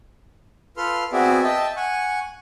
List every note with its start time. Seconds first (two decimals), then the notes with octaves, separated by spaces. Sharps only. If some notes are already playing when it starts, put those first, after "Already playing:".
0.77 F4 A4 B4 C6 F6
1.13 B3 C4 F#4 G#4 D5 E5
1.43 D#5 E5 G5 A5
1.76 F#5 G#5 C#6